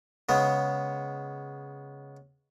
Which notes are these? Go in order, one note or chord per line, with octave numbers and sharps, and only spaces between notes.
C#3 G#3 B3